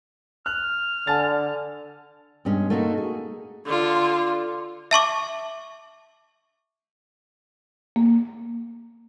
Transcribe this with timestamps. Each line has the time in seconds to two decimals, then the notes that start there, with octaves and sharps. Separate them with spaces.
0.46 F6 F#6
1.07 D3 G#5 A5 A6
2.45 G2 B2 G#3 C#4
2.70 A3 A#3 D#4 F#4 G#4 A4
2.98 G#4
3.66 D3 F4
4.91 E5 A5 C#6 D6
7.96 A#3